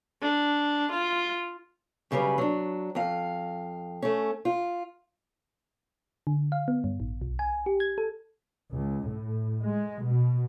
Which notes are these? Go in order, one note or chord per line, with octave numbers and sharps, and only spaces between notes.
D4
F4
F#2 C#3 G3 C#4 B4
F#3 D4
F2 F5
A3 C#4
F4
D3
F5
B3
G2
A1
B1
G#5
G4
G#6
A4
C#2
A2
G#3
B2